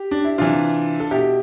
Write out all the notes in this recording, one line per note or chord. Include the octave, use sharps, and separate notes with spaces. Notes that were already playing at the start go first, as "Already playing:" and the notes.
Already playing: G4
D4
E4
C3 E3 D4 F4
A4
B2 E4 G4